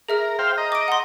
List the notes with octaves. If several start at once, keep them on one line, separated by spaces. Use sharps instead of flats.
G#4 A#4 E5 F6
C5 F5 G5
D#5 A#5
D6 D7
F#5 C6